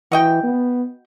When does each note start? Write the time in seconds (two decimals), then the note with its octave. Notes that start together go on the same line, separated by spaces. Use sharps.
0.12 E3 F#4 D#5 G5
0.43 B3